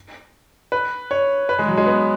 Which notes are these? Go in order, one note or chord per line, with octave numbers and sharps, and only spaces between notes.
B4
C#5
B4
G#3
F#3
G#3
B3